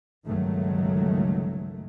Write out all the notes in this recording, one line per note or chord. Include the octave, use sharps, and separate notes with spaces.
G1 C#2 D#3 F#3 A3